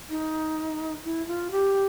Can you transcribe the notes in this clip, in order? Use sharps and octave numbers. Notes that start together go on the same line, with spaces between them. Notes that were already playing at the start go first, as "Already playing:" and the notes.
D#4
E4
F4
G4